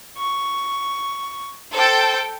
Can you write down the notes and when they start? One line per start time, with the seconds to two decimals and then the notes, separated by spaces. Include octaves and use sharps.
0.18 C#6
1.74 A4 C5 G5 A5